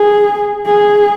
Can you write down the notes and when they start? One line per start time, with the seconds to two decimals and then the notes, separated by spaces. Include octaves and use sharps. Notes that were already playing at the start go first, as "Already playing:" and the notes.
Already playing: G#4
0.66 G#4